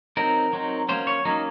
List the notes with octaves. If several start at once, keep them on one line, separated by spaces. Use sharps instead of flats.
F#3 C4 D#4 A#4
F#3 C4 D#4
F#3 A#3 C#4 C5
C#5
F#3 A#3 C#4 D#4